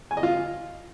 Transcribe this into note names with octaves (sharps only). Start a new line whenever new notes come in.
G#5
D#5
F4